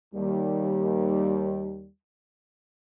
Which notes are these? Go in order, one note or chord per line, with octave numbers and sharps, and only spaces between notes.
D#2 G3